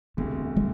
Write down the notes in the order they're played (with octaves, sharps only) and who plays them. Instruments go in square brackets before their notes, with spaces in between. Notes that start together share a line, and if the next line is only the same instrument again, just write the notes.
[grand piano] E1 D2 C3 [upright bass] A3
[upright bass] A#3